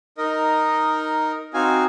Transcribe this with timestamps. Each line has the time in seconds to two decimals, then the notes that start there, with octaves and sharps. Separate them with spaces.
0.18 D#4 A#4 D#5
1.54 C4 D#4 F#4 F5 G#5